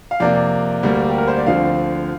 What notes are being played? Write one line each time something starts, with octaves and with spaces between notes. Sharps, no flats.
F5
F2 C3 A#3 D5
D2 D3 G3 A#3
G4
A#4
C5
D5
D2 D3 F3 C4 F5